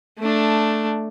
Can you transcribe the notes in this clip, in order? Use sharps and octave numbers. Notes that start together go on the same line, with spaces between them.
A3 D4